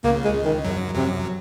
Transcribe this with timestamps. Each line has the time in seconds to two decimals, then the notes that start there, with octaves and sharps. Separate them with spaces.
0.04 C#2 C#3 A#3
0.24 G#3
0.45 D#3
0.65 F#2 F#3
0.95 F#2 C3 F#3